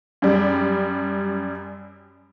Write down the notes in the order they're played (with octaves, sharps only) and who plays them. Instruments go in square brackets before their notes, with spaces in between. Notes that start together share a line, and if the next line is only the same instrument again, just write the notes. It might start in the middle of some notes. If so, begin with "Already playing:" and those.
[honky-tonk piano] F#2 G3